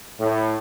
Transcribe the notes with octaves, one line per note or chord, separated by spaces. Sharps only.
A2